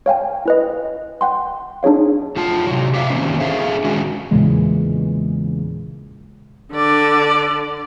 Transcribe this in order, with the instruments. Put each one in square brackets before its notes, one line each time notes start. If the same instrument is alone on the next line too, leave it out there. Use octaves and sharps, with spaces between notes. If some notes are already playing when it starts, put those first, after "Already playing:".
[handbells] C#5 F5 G5 G#5
E4 B4 D#5
F#5 G5 C6
D4 D#4 G#4 C#5 F5
[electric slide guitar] A3 F4 A5
C3 F#3
G4 E5 F5
D#3 G#3 A#3 C4 C#4
D4 G#4 A4 E5 F5
D#3 G#3 C#4 F#4
[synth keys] E2 A#2 C#3 E3 G#3
[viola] D3 D5